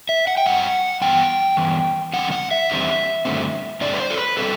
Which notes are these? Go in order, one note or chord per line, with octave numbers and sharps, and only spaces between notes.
E5
F#5
G5
G2 F#3 C4 F#5
G2 E3 B3 G5
G2 E3 B3
E2 D3 G3 C4 F#5
F#5
E5
E2 D3 G3 C4
G2 D3 A3 C4
G2 D3 A3 C4 D5
B4
C5
A4
B4
D3 G3 C4 A4